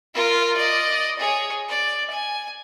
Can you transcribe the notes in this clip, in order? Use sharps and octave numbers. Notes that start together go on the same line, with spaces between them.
F4 A#4
D5 D#5
G#4 C#5
D5
G#5